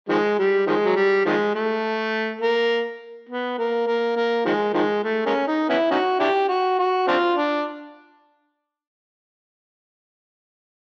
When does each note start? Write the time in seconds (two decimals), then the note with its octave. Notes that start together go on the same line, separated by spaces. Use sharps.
0.09 D#3 F3 G#3
0.39 G3
0.67 D#3 F3 G#3
0.85 F#3
0.96 G3
1.26 D#3 F3 G#3
1.55 A3
2.41 A#3
3.29 B3
3.58 A#3
3.87 A#3
4.17 A#3
4.45 D#3 F3 G#3
4.74 D#3 F3 G#3
5.04 A3
5.26 G#3 A#3 C#4
5.48 D#4
5.69 B3 C#4 E4
5.91 C#4 D#4 F#4
6.20 D4 E4 G4
6.49 F#4
6.79 F#4
7.08 C4 D4 F4
7.37 D4